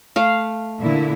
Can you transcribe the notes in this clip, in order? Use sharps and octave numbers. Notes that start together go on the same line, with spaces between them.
A3 F5
A#2 D3 E4